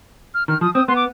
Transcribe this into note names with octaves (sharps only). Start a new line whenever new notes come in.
F6
D#3 F6
F3 D#6
C4 D#6
B3 C6
D6